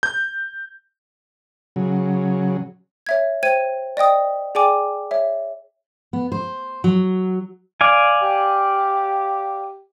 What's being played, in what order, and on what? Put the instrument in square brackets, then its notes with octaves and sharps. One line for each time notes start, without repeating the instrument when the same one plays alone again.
[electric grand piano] G6
[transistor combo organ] C#3 F#3
[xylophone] C#5 E5 G#6
C5 G5 G#6 D#7
D5 D#5 G5 D#6
G#4 D5 G5 G#5 D6
C#5 E5
[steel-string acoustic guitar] B3
C5
F#3
[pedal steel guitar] D5 F5 G#5
[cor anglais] G4